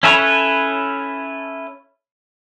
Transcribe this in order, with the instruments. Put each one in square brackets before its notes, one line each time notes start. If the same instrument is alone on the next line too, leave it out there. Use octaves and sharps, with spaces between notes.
[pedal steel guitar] C#4 E4 A4 B4 C#5